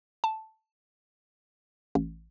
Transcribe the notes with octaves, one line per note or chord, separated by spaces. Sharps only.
A5
A1